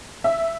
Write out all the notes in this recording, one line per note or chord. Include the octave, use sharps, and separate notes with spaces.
E5